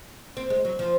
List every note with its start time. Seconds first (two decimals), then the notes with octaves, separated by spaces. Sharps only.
0.37 C4
0.50 G#3
0.65 F#3
0.79 F3